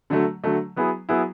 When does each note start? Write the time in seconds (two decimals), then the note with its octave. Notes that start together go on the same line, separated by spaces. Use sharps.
0.10 D3 F#3 A3
0.44 D3 F#3 A3
0.76 F#3 B3 E4 G#4
1.09 F#3 B3 E4 G#4